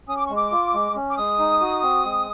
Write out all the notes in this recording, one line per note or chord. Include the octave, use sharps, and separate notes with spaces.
C#4 D#6
D6
G#3 C#6
D6
F4
G#3
C#4
D6
G#3 D#6
D#4
F#4
C4
G#3